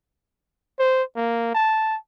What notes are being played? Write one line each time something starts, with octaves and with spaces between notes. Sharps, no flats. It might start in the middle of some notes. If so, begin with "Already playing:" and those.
C5
A#3
A5